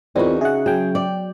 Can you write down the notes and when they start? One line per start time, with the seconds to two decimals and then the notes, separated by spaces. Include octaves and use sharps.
0.16 E2 C4 D#4 F4 F#4 A#4 D5
0.41 C#3 G#4 E5 F#5
0.66 F#3 G#4 G5
0.95 D5